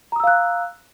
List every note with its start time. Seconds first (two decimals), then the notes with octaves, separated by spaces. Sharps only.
0.12 A#5
0.16 D#6
0.20 E6
0.24 F5
0.27 F#6